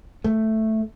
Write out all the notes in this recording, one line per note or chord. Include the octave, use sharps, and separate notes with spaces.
A3